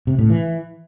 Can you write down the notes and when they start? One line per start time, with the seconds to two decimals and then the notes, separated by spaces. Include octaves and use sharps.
0.07 C3
0.19 A2
0.30 E3